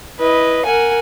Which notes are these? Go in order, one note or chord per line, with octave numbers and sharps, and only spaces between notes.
E4 B4 D#5
A#4 F#5 G#5